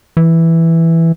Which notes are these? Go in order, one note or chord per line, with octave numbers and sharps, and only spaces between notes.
E3